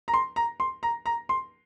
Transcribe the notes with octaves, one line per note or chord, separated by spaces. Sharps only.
A#5
C6
A#5
C6
A#5
A#5
C6